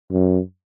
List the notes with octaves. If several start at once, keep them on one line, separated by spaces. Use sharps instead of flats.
F#2